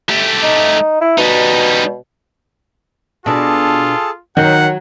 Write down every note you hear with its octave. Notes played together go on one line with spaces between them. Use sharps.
A3 G4
D#4
E4
B2 G3 D#4
B2 D4 F4 G#4 A4 A5
D#3 F#3 D#4 F#5